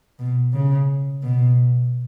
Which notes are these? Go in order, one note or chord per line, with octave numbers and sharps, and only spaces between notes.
B2
C#3
B2